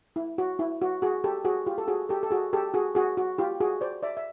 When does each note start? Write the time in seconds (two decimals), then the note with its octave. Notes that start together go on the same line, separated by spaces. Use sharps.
0.16 E4
0.38 F#4
0.59 E4
0.81 F#4
1.02 F#4 G#4
1.24 G4 A4
1.45 F#4 G#4
1.66 F4 G4
1.78 A4
1.88 F#4 G#4
2.09 G4 A4
2.23 A4
2.31 F#4 G#4
2.53 G4 A4
2.74 F#4 G#4
2.95 F#4 G#4
3.17 F#4
3.38 F4 G4
3.60 F#4 G#4
3.81 C5 D5
4.03 D5 E5
4.17 E5